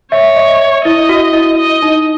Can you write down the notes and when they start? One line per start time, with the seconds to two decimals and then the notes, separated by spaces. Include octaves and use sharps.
0.12 C#5 E5
0.36 D#5
0.84 E4 D#5
1.09 F#4
1.33 E4
1.58 D#5
1.82 D#4